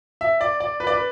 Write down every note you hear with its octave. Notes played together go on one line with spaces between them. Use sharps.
E5
D5
D5
B4
D5
B4